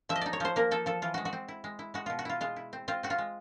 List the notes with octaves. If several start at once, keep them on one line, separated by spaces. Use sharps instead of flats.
F3 E5
D#5
D#4 D5
C#5
F3 C5
A#3 A#4
F3 A4
F3 A4
E3 F4
G#3 F#4
F#4
C4
E4
G#3
E4
G#3 F#4
B2 F4
F#4
E4 F4
G#3 F4
E4
C4
C4 F4
C4 F#4
F4
G#3